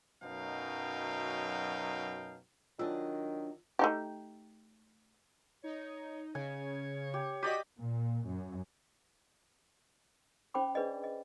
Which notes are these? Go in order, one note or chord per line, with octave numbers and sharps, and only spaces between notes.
F#2 B2 F#3 D#4 F5 G5
D#3 F#3 D4 F4 D#5 E6
A3 D#4 G4
D#4 C#5
C#3 C#5 G#5
G4
F#4 G4 D5 D#5 B6 D#7
A#2
F#2
C#4 C5 G5 B5 D6
D4 G#4 B4 D5 D#5
D#5